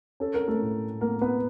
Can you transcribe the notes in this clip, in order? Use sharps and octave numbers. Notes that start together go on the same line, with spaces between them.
C#4 A4
A#4
A3 A4
A2
A3 A#3 A#4
B3 B4